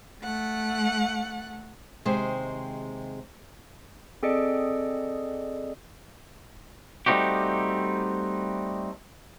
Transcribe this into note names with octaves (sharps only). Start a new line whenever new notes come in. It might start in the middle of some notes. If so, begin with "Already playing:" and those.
A3 F#5
D#2 C3 G#3 G#4 C5
C4 G#4 A4 D5 D#5 C#7
G3 A3 C4 D#4 F#4 G4